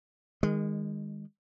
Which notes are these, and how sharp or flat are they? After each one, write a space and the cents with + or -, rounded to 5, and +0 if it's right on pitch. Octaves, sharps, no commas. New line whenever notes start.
D#3 +0 G#3 -25